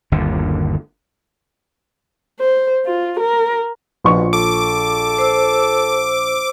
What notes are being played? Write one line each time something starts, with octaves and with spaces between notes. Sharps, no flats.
G1 D#2 D3
C5
F4
A#4
A#1 B2 F4 C#6
A4 D6
C5 E6